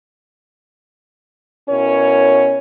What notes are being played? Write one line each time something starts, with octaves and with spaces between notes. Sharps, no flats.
B2 C#4 E4 A#4 C#5